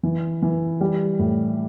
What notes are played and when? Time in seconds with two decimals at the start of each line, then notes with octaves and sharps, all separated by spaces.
0.03 E3
0.42 E3
0.81 G3
1.19 A2